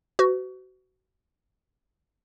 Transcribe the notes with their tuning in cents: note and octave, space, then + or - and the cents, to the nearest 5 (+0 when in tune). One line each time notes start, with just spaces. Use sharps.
F#4 +25 B4 +45